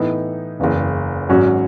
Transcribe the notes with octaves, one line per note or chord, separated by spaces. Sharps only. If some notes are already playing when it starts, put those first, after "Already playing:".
Already playing: A2 E3 B3 D#4
F#1 E2 C#3
G#1 G#2 F#3 C#4 F#4